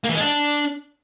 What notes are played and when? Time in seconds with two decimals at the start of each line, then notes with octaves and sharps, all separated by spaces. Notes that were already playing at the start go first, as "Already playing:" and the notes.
0.04 A#3
0.09 E3
0.15 G#3
0.20 D4